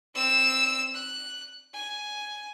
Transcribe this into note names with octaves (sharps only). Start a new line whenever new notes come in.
C4 E6
F#6
G#5